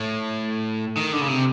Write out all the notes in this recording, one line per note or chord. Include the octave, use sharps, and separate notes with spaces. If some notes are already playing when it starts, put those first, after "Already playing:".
Already playing: A2
D#3
D3
C#3
C3